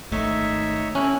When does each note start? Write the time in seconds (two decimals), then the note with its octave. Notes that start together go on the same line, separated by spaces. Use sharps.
0.12 G#1 G#2 D#3 A3 D#4 C#5 E5
0.95 C#4 E4 A4 F#6